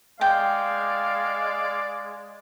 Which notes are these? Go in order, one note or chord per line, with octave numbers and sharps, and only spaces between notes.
G#3 D5 F5 G5